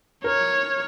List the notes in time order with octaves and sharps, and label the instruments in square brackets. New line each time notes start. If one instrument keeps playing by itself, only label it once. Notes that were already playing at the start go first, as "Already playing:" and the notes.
[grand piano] A#4 [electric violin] C#5